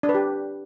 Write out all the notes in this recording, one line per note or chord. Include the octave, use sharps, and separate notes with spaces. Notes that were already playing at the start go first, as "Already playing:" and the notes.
D4
B4
G4